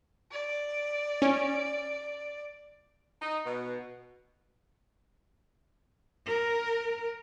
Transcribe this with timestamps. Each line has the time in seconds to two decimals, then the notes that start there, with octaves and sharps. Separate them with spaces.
0.31 D5
1.22 C#4
3.22 D#4
3.45 B2
6.27 A#4